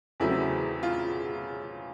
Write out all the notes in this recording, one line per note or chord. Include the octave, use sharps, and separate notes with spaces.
E2 C#3 F#3 A3 C4 E4
F4